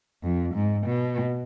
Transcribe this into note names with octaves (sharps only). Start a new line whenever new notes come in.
F2
G#2
B2